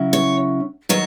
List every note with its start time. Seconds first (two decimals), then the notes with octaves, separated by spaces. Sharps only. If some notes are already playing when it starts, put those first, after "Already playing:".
Already playing: C#3 F#3 C#4 E4
0.13 C#5
0.89 D#3 F#3 C#5